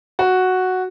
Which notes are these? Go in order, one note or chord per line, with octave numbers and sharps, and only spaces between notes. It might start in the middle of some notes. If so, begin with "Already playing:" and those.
F#4